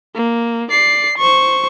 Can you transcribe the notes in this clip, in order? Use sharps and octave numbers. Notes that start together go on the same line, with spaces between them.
A#3
D5 C7
C5 C#6